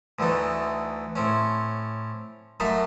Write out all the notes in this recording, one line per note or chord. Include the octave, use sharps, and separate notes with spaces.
D2 D3 E3 A3 D#4
A2 C4 C#4
F#2 A3 D#4 E5 F5 B5